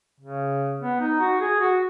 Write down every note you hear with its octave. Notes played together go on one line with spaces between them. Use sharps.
C#3
B3
D#4
F#4
G#4
F#4